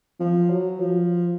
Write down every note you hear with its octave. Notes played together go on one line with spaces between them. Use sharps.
F3
F#3
F3